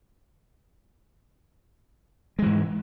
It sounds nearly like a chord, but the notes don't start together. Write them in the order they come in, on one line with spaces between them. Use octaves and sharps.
G#3 E3 G#2